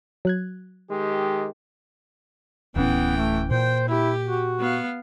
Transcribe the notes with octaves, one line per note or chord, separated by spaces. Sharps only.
F#3 F#6 G#6
D#3 G#3 G4
D1 A2 E3 B3 C#4 G5
A3
A#2 C5 G5
E4 G4
F#4
B3 F5